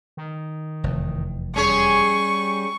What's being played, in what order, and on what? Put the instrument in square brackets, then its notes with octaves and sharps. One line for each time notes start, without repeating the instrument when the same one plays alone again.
[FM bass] D#3
[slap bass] F1 E2
[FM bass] G3 [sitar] C#4 G#4 C#5 [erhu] C#6